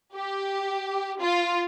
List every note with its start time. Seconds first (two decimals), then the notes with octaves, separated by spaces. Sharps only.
0.16 G4
1.20 F4